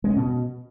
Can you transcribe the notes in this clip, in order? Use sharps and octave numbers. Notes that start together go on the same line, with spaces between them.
G#3
C#4
B2